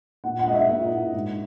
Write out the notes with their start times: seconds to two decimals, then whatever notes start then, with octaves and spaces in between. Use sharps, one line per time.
0.24 A#2 F#5
0.39 F#5
0.46 G#3 D#5
0.55 E5
0.69 A#2
0.92 E4
1.14 G#2